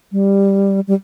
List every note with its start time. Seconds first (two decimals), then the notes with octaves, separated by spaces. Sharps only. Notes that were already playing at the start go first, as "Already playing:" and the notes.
0.12 G3
0.88 G3